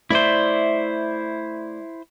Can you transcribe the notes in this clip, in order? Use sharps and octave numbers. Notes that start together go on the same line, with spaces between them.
A3 E4 C5 D5 E5